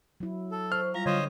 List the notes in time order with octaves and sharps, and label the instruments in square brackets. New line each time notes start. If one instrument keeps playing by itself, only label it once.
[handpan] F#3 E4
[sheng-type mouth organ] A4
[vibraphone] C5 C#6 [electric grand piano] F6
[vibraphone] G3 F4 F5 [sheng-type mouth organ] A#5
[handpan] D3 [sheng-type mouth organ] C5 C#5 D#5